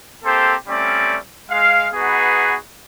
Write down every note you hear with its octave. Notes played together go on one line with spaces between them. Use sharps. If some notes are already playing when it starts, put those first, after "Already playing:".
A#3 C4 G4 A4 C5
G3 A3 C4 C#4 D5
G#3 F5
B3 D#4 F#4 G#4 B4